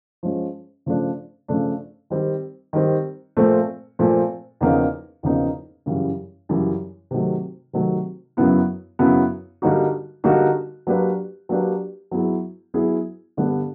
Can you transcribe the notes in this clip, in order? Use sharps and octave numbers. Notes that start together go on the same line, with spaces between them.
F3 G#3 C#4
C#3 F3 A3 D4
C#3 F3 A3 D4
D#3 G3 C4
D#3 G3 C4
A#2 F3 A3 C4
A#2 F3 A3 C4
E2 C#3 F3 A#3 D#4
E2 C#3 F3 A#3 D#4
F#2 C#3 E3 G3
F#2 C#3 E3 G3
C3 D#3 F#3 A3
C3 D#3 F#3 A3
F#2 C#3 F#3 B3 E4
F#2 C#3 F#3 B3 E4
D3 G3 A#3 D#4 F#4
D3 G3 A#3 D#4 F#4
F#3 A#3 D4 G4 B4
F#3 A#3 D4 G4 B4
F#3 B3 E4 G#4
F#3 B3 E4 G#4
G2 D3 G3 B3 D4